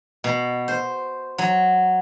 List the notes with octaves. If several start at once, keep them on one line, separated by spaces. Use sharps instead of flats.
B2
C5
F#3